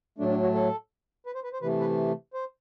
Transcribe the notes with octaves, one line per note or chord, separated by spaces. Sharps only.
A2 F#3 A3 D4
D4
F#4
A4
B4
C5
B4
C5
C3 E3 A3 B4
B4
C5